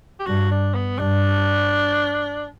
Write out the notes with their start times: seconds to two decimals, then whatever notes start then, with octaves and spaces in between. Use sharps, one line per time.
0.20 G4
0.26 G2 F#4
0.51 D4
0.74 B3
0.99 G2 D4